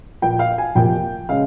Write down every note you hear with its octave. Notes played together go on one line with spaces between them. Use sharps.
A#2 F3 A#3 G5
F5
G#5
F2 C3 F3 A#3 G5
C#3 G#3 C#4 F5